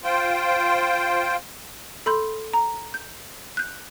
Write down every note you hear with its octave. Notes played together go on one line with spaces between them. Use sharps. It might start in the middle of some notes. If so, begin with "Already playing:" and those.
F4 C5 G5
A4 B5 C6 G6
A#5
G6
F#6 G6